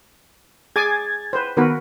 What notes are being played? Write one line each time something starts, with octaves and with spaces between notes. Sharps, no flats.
G#4 G#5 D6 G#6 A6
B4 C5
D#3 B3 F#4 A#4 B4